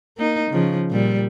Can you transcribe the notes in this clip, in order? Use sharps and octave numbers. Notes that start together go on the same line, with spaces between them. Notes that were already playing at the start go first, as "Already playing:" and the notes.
A#3 D#4
C#3 F3
A#2 G3